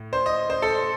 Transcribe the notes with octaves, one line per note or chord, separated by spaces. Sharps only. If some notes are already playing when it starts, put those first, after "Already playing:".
Already playing: A2
C5
D#5
C5
A4